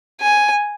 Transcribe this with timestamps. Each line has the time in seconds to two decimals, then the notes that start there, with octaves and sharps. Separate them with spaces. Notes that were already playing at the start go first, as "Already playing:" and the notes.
0.21 G#5